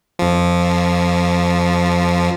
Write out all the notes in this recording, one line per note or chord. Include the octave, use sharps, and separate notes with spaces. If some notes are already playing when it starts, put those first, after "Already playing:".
F2 F3